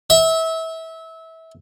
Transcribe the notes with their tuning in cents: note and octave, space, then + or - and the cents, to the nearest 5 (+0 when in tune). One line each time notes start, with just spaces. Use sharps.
E5 -25